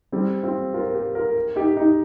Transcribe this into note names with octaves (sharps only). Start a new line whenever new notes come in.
G3 C4
C4 F4
F4 A#4
G4 C5
F4 A#4
D#4 G4
D#4 G4